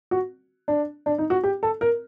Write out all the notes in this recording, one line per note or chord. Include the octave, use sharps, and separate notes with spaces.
F#4
D4
D4
D#4
F#4
G4
A4
A#4